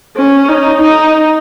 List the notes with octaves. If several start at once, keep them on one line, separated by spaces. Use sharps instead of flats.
C#4
D#4
D#4